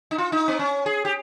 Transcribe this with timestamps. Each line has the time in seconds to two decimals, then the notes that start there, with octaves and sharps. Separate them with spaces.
0.11 D#4
0.18 F4
0.32 D#4
0.48 C4
0.59 C#4
0.86 G#4
1.05 G4